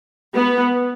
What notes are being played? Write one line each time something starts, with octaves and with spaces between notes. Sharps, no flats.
B3